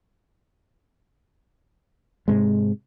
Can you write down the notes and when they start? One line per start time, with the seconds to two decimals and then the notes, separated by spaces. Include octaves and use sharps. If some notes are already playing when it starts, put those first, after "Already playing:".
2.28 G#2 C3 G#3